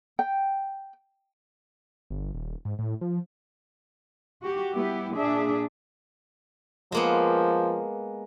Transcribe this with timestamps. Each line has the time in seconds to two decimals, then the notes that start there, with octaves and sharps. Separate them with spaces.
0.19 G5
2.10 G1
2.34 D#1
2.65 G#2
2.79 A2
3.01 F3
4.42 F#4 G4
4.74 G3 B3 E4 G4
5.15 A#2 D4 G#4 E5
6.92 F3 G#3 A#3 B3